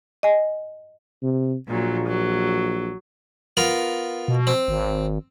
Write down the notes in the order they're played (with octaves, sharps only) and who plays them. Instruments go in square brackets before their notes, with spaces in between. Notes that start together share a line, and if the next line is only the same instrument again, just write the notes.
[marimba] D#5 G#5
[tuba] C3
[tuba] A#1 [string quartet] A#2 F#3
[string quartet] F#3
[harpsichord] B3 F4 A#4
[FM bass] B2
[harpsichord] C4
[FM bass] G#1